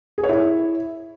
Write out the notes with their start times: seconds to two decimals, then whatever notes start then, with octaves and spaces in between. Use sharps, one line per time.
0.18 G#4
0.23 C#5
0.29 E4